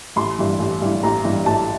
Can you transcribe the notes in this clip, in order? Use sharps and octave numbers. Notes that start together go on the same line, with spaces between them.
A1 C6
G2 E3
A1
G2 E3
A1 A#5
G2 E3
A1 A5